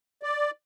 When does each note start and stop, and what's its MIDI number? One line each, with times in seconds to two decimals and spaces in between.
0.23 0.51 74